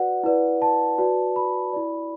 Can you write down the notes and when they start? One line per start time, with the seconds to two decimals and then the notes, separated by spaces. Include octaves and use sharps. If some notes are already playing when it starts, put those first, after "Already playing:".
Already playing: F#4 B4 D5 F#5
0.24 E4 B4 D5
0.62 A5
0.98 F#4 B4 D5
1.36 B5
1.73 E4 D5